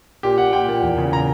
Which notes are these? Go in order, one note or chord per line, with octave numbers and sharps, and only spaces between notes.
A#2 G4
A#2 F#5
A#2 G5
A#2
E2
C#3
C#3 A#5